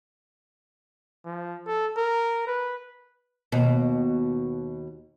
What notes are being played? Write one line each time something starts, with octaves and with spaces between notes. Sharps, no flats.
F3
A4
A#4
B4
D#2 B2